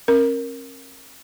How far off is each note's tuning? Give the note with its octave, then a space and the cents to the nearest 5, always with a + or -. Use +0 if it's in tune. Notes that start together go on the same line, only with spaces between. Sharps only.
C#4 -45 A#4 +0